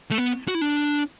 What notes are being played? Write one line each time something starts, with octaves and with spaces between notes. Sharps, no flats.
A3
B3
F#4
E4
D4